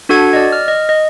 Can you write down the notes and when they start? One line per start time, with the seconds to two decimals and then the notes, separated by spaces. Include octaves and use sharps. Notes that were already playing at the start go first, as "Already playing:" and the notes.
0.09 D4 F#4 A4 F#5 G#6
0.33 D5 D#5
0.52 F6
0.68 D#5
0.89 D#5